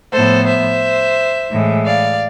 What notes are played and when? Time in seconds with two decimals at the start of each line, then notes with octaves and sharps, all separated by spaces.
0.12 A2 F3 B3 A4 C5
0.48 C5 E5
1.52 A2 E3 G#3
1.86 D5 F5